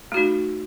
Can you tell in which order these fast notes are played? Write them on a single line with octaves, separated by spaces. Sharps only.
A3 F#4 D#4